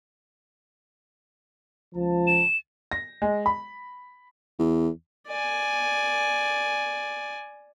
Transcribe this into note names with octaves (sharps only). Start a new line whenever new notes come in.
C#2 F3 A5
E7
A#6
G#3
B5
E2
D5 G#5